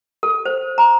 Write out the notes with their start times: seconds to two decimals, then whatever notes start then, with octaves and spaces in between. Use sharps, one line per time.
0.23 A4
0.45 C5
0.78 A#5